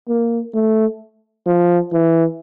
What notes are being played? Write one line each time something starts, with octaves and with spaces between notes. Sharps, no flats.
A#3
A3
F3
E3